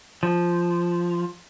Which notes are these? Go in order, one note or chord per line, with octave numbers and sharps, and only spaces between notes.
F3